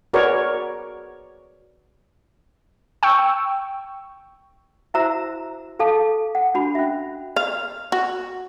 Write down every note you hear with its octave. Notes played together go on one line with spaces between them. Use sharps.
F#4 G#4 A#4 B4 C#5 D5
G5 C#6 E6
E4 F#4 C5 E5 A#5 E6
G#4 A4 F5 A5
F#5
D4 F#4 B5
C#4 E5
F5
F#4